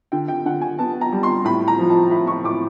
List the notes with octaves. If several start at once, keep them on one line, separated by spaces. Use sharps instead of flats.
D3 G5
G5
D3 F#5
G#5
B3 A5
A#5
G3
C6
A2 B5
A#5
F3
A5
A2 B5
C#6
A2 D6